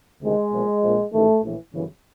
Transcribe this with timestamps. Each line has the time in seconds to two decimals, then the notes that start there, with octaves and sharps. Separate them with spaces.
0.22 D2 C3 D#3 G#3
0.52 B1 A#2 F3
0.82 A#1 A#2 F3
1.13 A1 G#2 D#3 A3
1.43 A#1 A2 E3
1.73 G1 F#2 C#3 E3